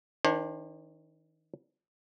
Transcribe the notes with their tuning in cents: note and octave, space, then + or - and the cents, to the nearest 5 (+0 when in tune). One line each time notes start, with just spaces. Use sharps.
D#3 +35 D4 +0 C5 +45